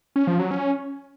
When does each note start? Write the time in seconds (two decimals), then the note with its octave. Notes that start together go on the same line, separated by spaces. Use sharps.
0.16 C#4
0.27 F3
0.39 F#3
0.51 C#4